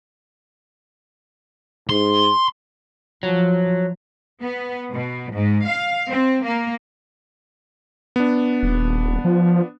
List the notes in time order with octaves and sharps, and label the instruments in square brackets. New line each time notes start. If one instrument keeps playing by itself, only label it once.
[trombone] G#2 [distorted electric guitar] C6
[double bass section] F3 [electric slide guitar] F#3
[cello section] B3
B2
G#2
F5
C4
A#3
[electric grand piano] B3 D4
[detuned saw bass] D#1
F3